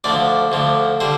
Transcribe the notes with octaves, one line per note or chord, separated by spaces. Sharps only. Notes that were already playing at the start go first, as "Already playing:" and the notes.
D2 D3 F3 D5
D2 D3 F3
D3 G3 C5